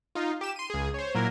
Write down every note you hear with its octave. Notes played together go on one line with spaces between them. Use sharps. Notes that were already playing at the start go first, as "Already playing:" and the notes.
D#4 F4
G4 E7
C6 D#7
C#2 G#4
C5 C#5
A#2 F#3 E4 A#4